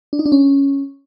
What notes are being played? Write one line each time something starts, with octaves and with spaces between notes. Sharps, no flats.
D4
D#4
D4
C#4